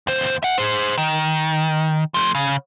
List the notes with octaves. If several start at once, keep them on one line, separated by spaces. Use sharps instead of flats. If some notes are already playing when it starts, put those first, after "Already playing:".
D#2 C5
E5 F#5
G#4 C5
D#3
F3 A3
C#3